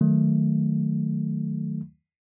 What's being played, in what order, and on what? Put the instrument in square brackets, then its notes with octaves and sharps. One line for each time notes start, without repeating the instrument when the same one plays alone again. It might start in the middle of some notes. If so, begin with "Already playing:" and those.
[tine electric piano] D#3 F#3 A3